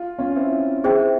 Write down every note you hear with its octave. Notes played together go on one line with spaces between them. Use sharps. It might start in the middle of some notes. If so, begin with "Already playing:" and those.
Already playing: F4
C#4 F4
C4 E4
F4
C4 E4 G#4 C5 E5 G5